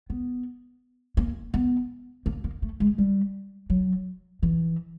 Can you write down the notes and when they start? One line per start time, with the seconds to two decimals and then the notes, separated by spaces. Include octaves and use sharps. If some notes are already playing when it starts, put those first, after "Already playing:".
0.10 B3
1.17 A#3
1.54 B3
2.26 A#3
2.44 A#3
2.62 A3
2.80 G#3
2.98 G3
3.70 F#3
4.43 E3